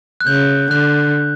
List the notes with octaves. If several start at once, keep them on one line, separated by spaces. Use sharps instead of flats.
F#6
C#3 G6
D3 F#6